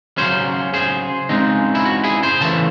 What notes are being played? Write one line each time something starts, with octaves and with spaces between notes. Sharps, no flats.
C#3 F#3 C#4 G#4 C5
G#4 C5
C#3 G#3 C4 D#4
E4
F#4
E4 G#4
G#4 C5
C#3 E3 A3 A5